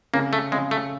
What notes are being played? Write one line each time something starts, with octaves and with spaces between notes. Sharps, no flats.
C#3 A#3
A3
C#3 G#3
A3